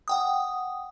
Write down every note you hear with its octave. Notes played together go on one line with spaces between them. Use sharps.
F#5 G5 D#6